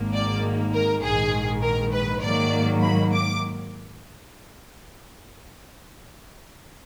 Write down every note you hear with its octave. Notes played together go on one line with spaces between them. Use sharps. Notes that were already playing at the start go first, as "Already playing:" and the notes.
Already playing: G#1 G#2 D#3 A#3
D5
A#4
A#1 G#2 D#3 G#4
A#4
B4
G#2 D#3 F#3 A#3 D5
B5
D6